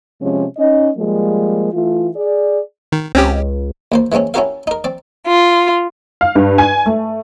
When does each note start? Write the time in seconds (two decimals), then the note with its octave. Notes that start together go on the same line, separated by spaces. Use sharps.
0.20 C3 F3 G#3 C#4
0.57 C#4 D#4 D#5
0.96 F3 G3 G#3 A#3
1.72 E3 A3 F4
2.16 G#4 D5
2.92 D#3
3.15 C#2 C4 C#4 G4
3.92 D#2 A#3 C5
4.12 E3 G#3 A#3 C4 C#4
4.34 C#4 E4 F#4 G4 A#4 F5
4.67 D#4 A#4
4.84 C4 D5
5.26 F4
6.21 F5
6.35 G2
6.58 G#5
6.86 A3